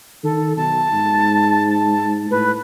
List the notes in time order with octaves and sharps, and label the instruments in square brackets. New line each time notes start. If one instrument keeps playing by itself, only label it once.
[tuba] D#3 [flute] A4
[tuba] B1 [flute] A5
[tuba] G#2
[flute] A5
[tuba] A2 [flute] B4